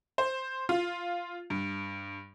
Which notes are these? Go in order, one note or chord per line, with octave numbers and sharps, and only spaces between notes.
C5
F4
G2